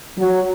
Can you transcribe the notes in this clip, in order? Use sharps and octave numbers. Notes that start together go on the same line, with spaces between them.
F#3